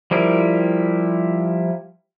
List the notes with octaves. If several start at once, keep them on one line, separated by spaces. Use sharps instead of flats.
F3 G3 E4 A#4